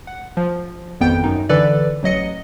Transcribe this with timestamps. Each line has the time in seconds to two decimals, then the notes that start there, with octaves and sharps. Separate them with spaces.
0.07 F#5
0.37 F3
1.01 G#1 F2 B3 G5 G6
1.24 F#2 D#4
1.49 D3 E3 A4 B4 D5
2.03 A1 F#3 D#5 C#7